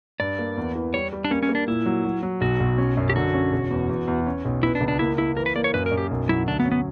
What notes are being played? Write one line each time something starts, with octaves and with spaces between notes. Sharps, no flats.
G2 D5
A#3
E2
E3
G3 C#5
G3
D4
A#3 C#4
C#4
A#3
D4
A#2 E4
F#3
F#3
F#3
B1 F#4
B1
C#4
F#2
G4
D3 F#4
C#4
E1
E2
E2
E2
C#4
B1
B3 E4
D4
C#2
D4
A#3 E4
A#3 E4
E3 A#4
B4
A#3 D5
C#5
F#2 B4
A#4
F#2
G4
B1
F#3 E4
D2 D4
B3
C#4
B3